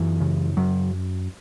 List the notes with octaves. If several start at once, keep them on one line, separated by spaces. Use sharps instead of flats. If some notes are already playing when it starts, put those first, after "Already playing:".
Already playing: F#2 E3
C#3
F#2 F#3